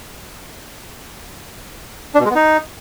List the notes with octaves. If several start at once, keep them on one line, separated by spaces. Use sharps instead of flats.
D4
B2
G#3
B3
D#4